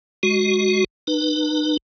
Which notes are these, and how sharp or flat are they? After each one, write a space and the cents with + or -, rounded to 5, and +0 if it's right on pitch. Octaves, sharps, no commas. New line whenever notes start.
G#3 +0 F#4 +5
D#4 -40 B4 -10